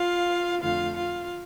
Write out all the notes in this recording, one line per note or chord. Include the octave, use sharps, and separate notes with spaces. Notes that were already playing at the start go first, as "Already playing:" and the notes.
Already playing: F4 F5
F2 D3 A3 F4 F5
F4 F5